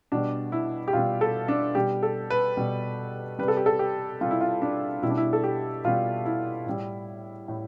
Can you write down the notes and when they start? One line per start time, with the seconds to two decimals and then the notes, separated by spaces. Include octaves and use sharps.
0.12 B2 G3 D4
0.52 E4
0.88 G4
0.93 B2 G3 F4
1.21 A4
1.48 D4
1.75 B2 G3 G4
2.03 A4
2.30 B4
2.57 B2 G3
3.39 G3 B4
3.43 C3 A4
3.57 G4
3.66 A4
3.79 G4
4.21 C3 G3 F4
4.31 E4
4.41 F4
4.62 D4
5.02 B2 G3 E4
5.10 D4
5.17 E4
5.33 A4
5.44 G4
5.85 B2 G3 F4
6.25 E4
6.66 A2 G3
7.48 A2